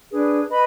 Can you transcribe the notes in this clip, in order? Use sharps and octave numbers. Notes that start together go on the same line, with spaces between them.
D4 G#4 B4
B4 D#5 B5